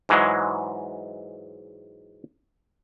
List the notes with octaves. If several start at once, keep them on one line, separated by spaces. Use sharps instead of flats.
G#2 E3 F#3 G#3